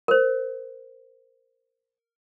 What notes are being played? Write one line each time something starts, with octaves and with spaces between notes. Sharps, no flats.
A#4 C5